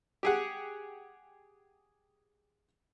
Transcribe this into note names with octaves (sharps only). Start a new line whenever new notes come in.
G4 G#4 F#5